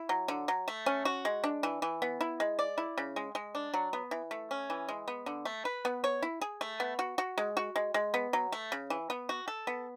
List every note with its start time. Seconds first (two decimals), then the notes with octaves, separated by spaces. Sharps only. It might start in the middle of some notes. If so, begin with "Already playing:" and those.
Already playing: E4
0.09 F#3
0.28 D3
0.48 F#3
0.68 A3
0.86 C#4
1.05 F#4
1.25 G#3
1.44 D4
1.63 E3
1.82 E3
2.02 B3
2.21 E4
2.40 G#3
2.59 D5
2.78 E4
2.98 C#3
3.16 G#3
3.35 G#3
3.55 D4
3.74 F#3
3.93 B3
4.11 E3
4.31 A3
4.51 C#4
4.70 E3
4.88 G#3
5.08 B3
5.26 D3
5.45 A3
5.65 B4
5.85 B3
6.04 C#5
6.22 E4
6.41 G#4
6.61 A3
6.80 B3
6.99 F#4
7.18 F#4
7.38 G#3
7.57 F#4
7.76 G#3
7.94 G#3
8.14 B3
8.33 F#3
8.52 A3
8.72 C#3
8.90 E3
9.10 B3
9.29 F#4
9.48 A4
9.67 B3